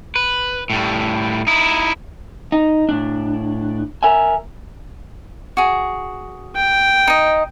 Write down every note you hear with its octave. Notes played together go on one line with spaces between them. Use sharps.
B4
A2 G3
D#4 E4
D#4
A2 D4
A#4 E5 G#5
F#4 G#4
G5
D#4 D#5